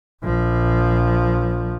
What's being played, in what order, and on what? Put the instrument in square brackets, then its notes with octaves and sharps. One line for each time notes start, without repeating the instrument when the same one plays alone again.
[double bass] A#1 F3